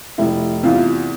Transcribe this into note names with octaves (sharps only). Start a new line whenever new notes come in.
F1 E4
E2 C3 F4